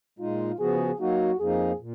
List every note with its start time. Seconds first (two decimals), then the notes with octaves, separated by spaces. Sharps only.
0.19 A#2 G#3 D#4 F4
0.59 C#3 F3 B3 F#4 G#4
0.99 F#3 A#3 D#4 F#4
1.39 F2 F3 A#3 D#4 G#4
1.79 A#2